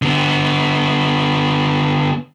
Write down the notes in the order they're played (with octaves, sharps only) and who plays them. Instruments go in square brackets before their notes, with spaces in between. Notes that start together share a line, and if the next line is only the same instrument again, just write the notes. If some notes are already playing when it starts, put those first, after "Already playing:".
[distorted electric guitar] D3 B3